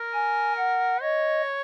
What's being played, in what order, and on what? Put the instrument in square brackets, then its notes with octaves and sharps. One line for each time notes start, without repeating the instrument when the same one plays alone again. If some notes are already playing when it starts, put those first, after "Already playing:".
Already playing: [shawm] A#4
[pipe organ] G#5
F#5
[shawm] C#5 [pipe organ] D#5